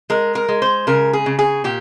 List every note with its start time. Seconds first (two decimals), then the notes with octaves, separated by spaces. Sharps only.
0.10 G#3 A#4
0.35 A#4
0.49 G#3
0.62 C5
0.87 C#3 A#4
1.13 G#4
1.26 C#3
1.39 G#4
1.64 A#2 G4